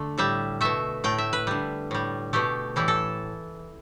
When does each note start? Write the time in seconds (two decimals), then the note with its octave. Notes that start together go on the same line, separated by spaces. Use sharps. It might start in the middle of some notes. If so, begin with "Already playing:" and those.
Already playing: D3 A3
0.18 A2 G3 E5
0.61 B2 A3 E5
1.04 A2 A3 G5
1.18 E5
1.33 B4
1.47 D3 G3
1.91 A2 G3
2.33 B2 A3 G4
2.76 A2 E3 G3 E4
2.88 A4